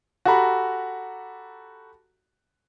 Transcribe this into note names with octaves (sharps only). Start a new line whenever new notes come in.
F#4 G4 A4 A#5 B5